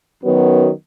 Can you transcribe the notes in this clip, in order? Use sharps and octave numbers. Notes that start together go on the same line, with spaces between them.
F#2 D#3 F#3 B3